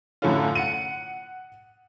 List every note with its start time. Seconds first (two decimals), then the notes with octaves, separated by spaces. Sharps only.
0.22 F#2 A2 D3 A3 C#4 F4
0.55 F#5 C#7 D#7